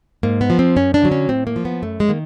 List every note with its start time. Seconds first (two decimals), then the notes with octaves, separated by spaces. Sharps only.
0.23 G#2 A#3
0.41 B3
0.50 F3
0.59 C4
0.76 F#2 C#4
0.94 D4
1.02 D3 F#3
1.12 C#4
1.29 A2 C4
1.47 A#3
1.56 F3
1.65 B3
1.82 F#2 A3
2.00 G#3
2.09 D#3 A#3